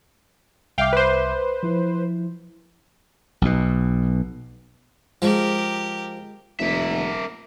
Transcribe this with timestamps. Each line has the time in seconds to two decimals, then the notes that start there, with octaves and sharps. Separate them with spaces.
0.78 C2 E5 F5 G5 D6
0.93 B4 C5
1.63 F3 E4
3.42 B1 B2
5.22 F3 G#3 G4 A#4
6.60 F1 A#3 E5